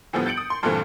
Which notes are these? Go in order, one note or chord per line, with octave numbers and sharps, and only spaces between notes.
A2 D3 F3 G3 B3
G6 A6 C#7 D7 F#7
D#6
C6
G2 A#2 D3 E3 A3 C4